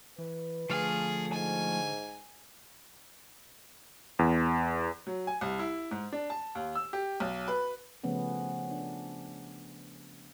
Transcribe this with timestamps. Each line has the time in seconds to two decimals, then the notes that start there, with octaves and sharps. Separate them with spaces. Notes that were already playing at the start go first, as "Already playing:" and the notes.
0.18 E3 B4
0.70 D3 F3 A3 G#4 F5
1.33 G#2 G#5
4.19 E2
5.07 F#3
5.27 G#5
5.41 C2
5.59 E4
5.91 G#2
6.12 D4
6.30 A5
6.55 D#2
6.75 E6
6.93 G4
7.20 B1
7.48 B4
8.04 C#3 F3 A3 B3 C#4
8.71 D4